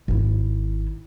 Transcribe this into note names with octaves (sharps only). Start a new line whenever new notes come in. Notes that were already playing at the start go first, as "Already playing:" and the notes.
G#1 E4